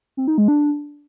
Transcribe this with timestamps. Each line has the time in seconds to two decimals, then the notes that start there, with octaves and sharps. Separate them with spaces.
0.17 C4
0.28 D#4
0.38 G#3
0.48 D4